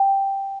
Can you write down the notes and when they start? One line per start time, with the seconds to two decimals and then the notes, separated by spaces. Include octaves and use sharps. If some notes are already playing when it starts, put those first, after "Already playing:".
Already playing: G5